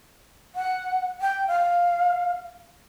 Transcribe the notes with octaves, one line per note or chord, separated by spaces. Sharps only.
F#5
G5
F5